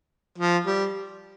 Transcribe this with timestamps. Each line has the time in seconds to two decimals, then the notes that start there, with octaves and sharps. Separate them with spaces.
0.39 F3
0.66 G3